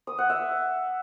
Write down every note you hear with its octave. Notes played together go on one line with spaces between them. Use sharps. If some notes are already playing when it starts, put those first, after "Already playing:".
D#6
F#5
E5